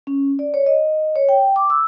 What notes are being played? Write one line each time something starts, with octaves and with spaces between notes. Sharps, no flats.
C#4
D5
C#5
D#5
C#5
G5
D6
E6